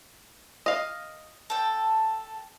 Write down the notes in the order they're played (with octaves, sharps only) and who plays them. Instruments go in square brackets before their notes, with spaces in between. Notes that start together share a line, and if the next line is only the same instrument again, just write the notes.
[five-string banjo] D#5 F5
[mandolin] A4 G5